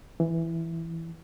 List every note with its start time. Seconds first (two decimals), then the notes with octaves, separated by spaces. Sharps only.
0.20 E3